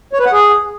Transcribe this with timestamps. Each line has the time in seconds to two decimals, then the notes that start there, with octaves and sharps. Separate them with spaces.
0.13 C#5
0.20 B4
0.26 F#5
0.32 G#4